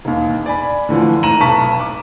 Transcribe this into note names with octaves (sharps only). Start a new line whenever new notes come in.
E1 D#2
D5 G#5 B5
A2 D3 E3 F3
G#1 A#5 D#7 E7 F#7
F1 B1 A5 C#6 B6
D6